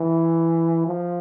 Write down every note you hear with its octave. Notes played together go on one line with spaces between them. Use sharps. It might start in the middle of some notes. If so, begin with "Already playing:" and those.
Already playing: E3
F3